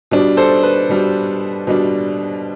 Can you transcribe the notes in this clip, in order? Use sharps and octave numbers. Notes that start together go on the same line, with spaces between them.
B2 G3 D4
A4 C5
B4
B2 G3 D4
B2 G3 D4